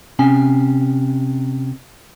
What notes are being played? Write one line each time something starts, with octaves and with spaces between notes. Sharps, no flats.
C3 C#4 G#5